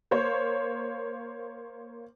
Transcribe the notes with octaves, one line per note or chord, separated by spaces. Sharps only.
A#3 C5 C#5